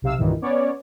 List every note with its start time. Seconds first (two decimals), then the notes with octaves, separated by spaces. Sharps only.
0.02 B1 C3 F5 E6
0.18 C2 G2 A#2 D#3 E3
0.42 B3 C#4 C#5 D5